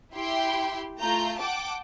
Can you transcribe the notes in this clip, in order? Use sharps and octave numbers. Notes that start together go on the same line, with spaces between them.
E4 G4 G5 C6
A3 F4 A#5 G6
F#5 G5 A5 D6